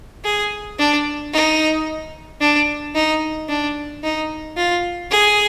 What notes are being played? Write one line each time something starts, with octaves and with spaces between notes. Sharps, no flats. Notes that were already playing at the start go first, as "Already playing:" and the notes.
G#4
D4
D#4
D4
D#4
D4
D#4
F4
G#4